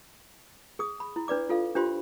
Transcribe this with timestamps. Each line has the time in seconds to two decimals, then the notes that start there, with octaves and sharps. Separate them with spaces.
0.79 G#4 D#6
1.00 B5
1.16 E4
1.28 D4 B4 D5 D6
1.49 F4 A4 F5
1.75 D4 F4 G4 C5 B5 C6